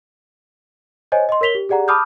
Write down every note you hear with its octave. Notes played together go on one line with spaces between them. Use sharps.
C5 C#5 D#5 G#5
D#5 C6
A#4 C#5 B6 F7 G7
G4
G4 G#4 D5 F#5 A#5
A5 B5 D6 D#6 F6 G6